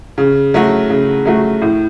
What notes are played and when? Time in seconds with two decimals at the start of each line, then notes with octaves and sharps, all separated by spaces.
0.18 C#3
0.54 F#3 A3 F#4
0.90 C#3
1.25 F#3 A3 F#4
1.62 A2